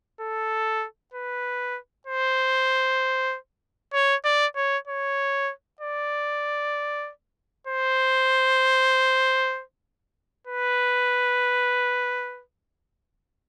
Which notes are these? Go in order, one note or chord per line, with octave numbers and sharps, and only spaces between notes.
A4
B4
C5
C#5
D5
C#5
C#5
D5
C5
B4